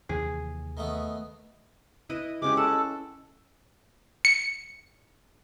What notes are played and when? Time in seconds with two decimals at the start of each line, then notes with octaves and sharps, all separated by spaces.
0.09 D#2 C3 E3 G#4
0.77 D#3 A3 B3
2.09 E4 B4 D#5
2.42 G#3 C#4 G4 D6
2.57 A4 F#5 A5
4.25 C#7